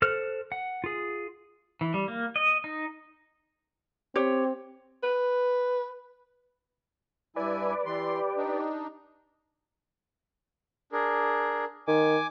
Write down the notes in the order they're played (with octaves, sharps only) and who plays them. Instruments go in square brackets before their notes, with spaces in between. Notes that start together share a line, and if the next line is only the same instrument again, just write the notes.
[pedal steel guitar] A4 C5 F6 F#6
F#5
F4 G#4
E3
G3
A#3
D#5
D#4
[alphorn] C4 [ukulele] G4 C#5
[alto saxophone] B4
[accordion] G2 E4 G#5 [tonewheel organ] B4 D5
[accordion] E3 C6 [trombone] G4
[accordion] D4 D#4
[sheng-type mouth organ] D4 G#4 A#4
[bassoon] D#3 [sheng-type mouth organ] G#5 D6